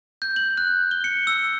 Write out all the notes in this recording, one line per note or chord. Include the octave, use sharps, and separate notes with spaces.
G6
F#7
F#6
G7
C#7
E6